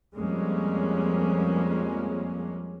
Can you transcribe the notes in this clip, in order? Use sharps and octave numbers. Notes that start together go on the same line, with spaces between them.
F2 G3 G#3 A#3 C#4